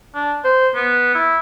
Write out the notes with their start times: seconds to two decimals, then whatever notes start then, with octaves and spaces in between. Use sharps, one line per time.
0.15 D4
0.44 C5
0.75 B3
1.15 E4